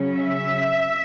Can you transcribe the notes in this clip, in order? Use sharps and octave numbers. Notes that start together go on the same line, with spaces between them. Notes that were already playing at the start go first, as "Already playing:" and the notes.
Already playing: C#3 F#3 C#4
E5